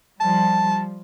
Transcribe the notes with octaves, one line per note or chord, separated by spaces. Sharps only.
F3 G3 A5